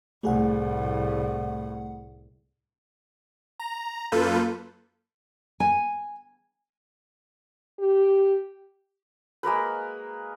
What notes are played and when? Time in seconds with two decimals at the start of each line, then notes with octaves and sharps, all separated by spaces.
0.23 C2 A2 A3 G#4 F#5
3.60 A#5
4.12 F#2 A#3 F4 A4 B4 G6
5.60 G#5
7.80 G4
9.43 G#3 A#3 A#4 B4